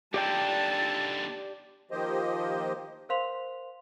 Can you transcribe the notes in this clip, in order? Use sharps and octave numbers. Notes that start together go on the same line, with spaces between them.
D#2 D3 G4 D5 G5 A5
D#3 F3 A#3 G4 C5 D#5
A#4 C5 F5 C6 F7